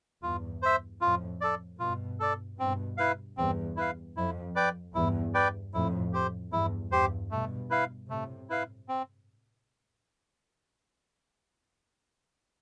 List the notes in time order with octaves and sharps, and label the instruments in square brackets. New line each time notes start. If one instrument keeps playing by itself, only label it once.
[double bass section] E2 G2 [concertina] F4
[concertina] C5 E5
[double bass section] F2 A2 [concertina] F4
[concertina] A4 D5
[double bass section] G2 B2 [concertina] F4
[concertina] A4 D5
[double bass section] G2 B2 [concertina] C4
[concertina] E4 B4 F5
[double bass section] E2 G2 [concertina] C4
[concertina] E4 B4 F5
[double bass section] F2 [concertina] E4
[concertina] B4 D5 G5
[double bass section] E2 G2 [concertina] E4
[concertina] B4 D5 G5
[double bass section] F2 A2 [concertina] E4
[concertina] G4 C5
[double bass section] E2 G2 [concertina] E4
[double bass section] E2 G2 [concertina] G4 C5
[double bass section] G2 B2 [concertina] A3
[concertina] E4 B4 F5
[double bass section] A2 C3 [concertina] A3
[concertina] E4 B4 F5
C4